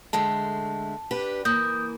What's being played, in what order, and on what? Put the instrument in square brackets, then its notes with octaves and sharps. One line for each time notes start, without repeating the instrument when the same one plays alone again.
[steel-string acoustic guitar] D3 G#3 A3 [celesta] A5
[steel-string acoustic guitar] D4 G4 B4
[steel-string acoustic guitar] E3 A#3 [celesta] D#6 G6